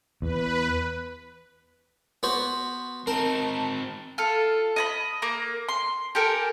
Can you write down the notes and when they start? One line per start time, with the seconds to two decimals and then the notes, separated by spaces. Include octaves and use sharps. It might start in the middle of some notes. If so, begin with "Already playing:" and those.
0.22 E2 B4
2.23 B3 F#4 C5
3.07 C4 D#4 A#4 A5
4.18 F4 A4
4.76 D#5 A5 B5
5.22 A#3 A#5
5.69 C6
6.15 G4 A4 A#4 G#5